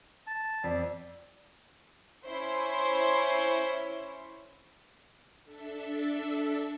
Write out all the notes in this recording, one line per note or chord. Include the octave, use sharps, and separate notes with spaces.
A5
F2 D5
C#4 E4 C5
D4 A4 E5